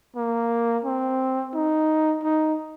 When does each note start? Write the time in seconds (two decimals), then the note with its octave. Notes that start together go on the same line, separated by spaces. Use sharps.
0.16 A#3
0.85 C4
1.54 D#4
2.23 D#4